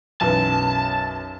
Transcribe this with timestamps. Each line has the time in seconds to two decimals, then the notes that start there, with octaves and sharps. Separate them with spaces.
0.21 B1 F#2 E3 A5